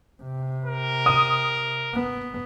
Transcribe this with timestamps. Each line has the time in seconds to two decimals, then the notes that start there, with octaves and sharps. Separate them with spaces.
0.23 C3
0.65 A#4
1.06 D#6
1.94 B3